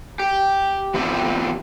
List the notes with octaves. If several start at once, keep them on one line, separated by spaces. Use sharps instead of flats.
G4
E3 B3 C4 F4 G4